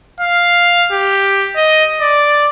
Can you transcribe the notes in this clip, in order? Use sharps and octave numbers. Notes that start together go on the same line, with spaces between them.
F5
G4
D#5
D5